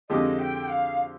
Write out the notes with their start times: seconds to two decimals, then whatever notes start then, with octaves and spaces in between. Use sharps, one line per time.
0.09 F2 D3 G#3 C4 G4 D#5
0.39 G5
0.69 F5